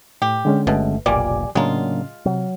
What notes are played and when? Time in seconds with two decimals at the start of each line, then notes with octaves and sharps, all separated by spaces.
0.22 A2 G4
0.45 D3 G#3 C#4
0.67 G1 B2 A3
1.06 F1 B1 A#2 G3 A#3 D5 G#5 D6
1.55 A2 C#3 F#3 G#3 A#3 C#4 D4 F4
2.26 C3 F#3